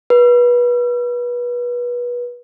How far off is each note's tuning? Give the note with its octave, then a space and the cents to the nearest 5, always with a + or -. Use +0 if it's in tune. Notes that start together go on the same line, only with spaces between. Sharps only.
B4 -25